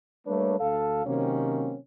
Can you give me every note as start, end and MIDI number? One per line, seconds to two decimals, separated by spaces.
0.27 0.59 55
0.27 0.59 57
0.27 0.59 58
0.27 0.59 62
0.27 0.59 71
0.27 0.59 73
0.60 1.05 38
0.60 1.05 69
0.60 1.05 77
1.06 1.77 48
1.06 1.77 51
1.06 1.77 54
1.06 1.77 58
1.06 1.77 60
1.06 1.77 61